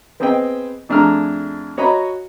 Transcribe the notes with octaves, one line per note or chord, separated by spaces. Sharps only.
B3 C4 G#4 C5 D#5 G5
F2 A3 D4 G#4 A#5 F6
F#4 C#5 D#5 A#5 B5